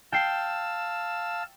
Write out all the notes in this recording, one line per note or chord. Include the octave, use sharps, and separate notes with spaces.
F5 G5 A5 E6 C7